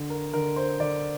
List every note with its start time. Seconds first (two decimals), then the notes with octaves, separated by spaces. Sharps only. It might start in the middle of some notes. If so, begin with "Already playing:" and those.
Already playing: D3
0.10 A#4
0.33 D3 A#4
0.56 C5
0.80 D3 D5